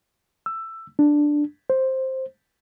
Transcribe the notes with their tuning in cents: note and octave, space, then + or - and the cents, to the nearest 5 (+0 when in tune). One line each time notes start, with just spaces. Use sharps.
E6 +10
D4 +5
C5 +5